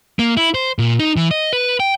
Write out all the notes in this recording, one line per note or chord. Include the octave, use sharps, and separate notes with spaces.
A#3
E4
C5
A#2
D#4
E3
D#5
B4
G5